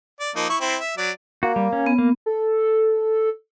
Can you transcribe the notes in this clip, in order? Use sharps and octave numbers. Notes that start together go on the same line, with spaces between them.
D5
F3 A#3 D#4
E4 C#6
C4 E4
E5
F#3 D5
A#3 F#4
G3
C#4
B3
A#3
A4